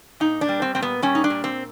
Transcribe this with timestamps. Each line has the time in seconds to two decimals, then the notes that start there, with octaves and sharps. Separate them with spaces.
0.20 A#2 D#4
0.41 D4
0.49 G3
0.62 C4
0.75 A#2 C4
0.82 B3
1.02 G3 C#4
1.15 D#4
1.24 D4
1.30 A#2
1.44 C4